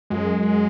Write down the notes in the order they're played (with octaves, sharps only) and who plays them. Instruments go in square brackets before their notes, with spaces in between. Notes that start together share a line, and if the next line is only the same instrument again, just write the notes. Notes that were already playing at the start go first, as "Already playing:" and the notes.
[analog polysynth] F#2 [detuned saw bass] G#3